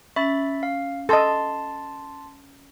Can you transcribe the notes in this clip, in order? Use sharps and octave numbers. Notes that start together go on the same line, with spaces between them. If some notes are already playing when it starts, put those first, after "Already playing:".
C#4 E5 B5 A6
F5
A4 D#5 A5 C6 A6